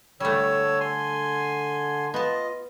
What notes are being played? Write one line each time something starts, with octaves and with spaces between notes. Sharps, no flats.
D3 G3 A3 C#5 E6
G#5 C6
B3 F4 D#5 A5